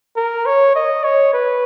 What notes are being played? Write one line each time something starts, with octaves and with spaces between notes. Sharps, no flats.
A#4
C#5
D#5
C#5
B4